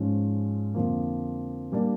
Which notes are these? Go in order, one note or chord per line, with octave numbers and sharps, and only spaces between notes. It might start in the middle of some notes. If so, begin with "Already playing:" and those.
Already playing: G#2 F3 G#3 C#4
F2 D3 F3 A#3
G3 A#3 D4